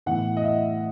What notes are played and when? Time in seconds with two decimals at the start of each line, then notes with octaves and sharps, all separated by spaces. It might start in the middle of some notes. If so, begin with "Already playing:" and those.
0.06 A2 E3 B3 E4 F#5
0.37 D#5
0.43 E5